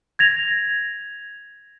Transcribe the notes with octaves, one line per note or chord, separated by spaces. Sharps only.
G#6 A#6 F7